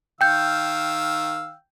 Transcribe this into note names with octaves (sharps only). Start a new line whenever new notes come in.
D#3 F5 G5 E6 G6